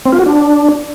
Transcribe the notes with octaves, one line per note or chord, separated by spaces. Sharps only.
C4
F4
F#4
D4